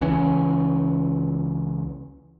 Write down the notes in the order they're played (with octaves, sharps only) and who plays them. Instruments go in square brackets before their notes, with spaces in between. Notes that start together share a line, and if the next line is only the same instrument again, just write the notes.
[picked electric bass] C#2 E3 C#4